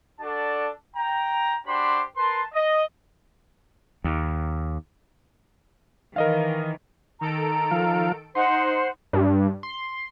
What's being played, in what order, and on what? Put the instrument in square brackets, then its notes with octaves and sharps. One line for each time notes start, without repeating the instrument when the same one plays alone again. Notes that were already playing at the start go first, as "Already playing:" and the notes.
[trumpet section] D4 F#4 A4 D5 A5
G5 A#5
D4 F#4 G4 C5 B5 C6
A#4 B4 A5 C6
D#5
[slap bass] D#2
[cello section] D#3 E3 [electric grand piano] A#4 D#5 F5
[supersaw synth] D#3 A4 D7 [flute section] A#5
[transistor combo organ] F3 F5
[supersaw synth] D#4 [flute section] C5 F#5 [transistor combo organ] C6
[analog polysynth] G2
C6